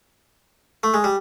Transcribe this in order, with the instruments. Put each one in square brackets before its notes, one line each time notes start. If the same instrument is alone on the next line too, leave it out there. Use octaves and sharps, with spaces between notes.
[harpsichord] A3
G#3
G3